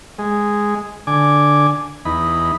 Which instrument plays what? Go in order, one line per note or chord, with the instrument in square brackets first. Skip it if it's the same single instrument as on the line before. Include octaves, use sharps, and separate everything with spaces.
[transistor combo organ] G#3
D3 G#5 D6
E2 D#4 B5